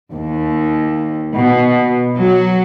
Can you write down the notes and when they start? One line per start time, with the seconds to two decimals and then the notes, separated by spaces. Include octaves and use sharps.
0.12 D#2
1.34 B2
2.16 F#3